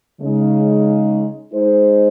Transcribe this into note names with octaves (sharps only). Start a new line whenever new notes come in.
C#3 G#3 D#4
G#3 D#4 G#4 C5